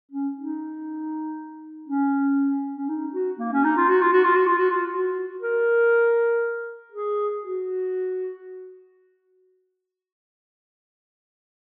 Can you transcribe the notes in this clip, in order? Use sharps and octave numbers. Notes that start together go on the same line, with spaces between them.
C#4
D#4
C#4
C#4
D#4
F#4
A#3
C#4
D#4
F4
F#4
F4
F#4
F4
F#4
F4
F#4
F4
F#4
A#4
G#4
F#4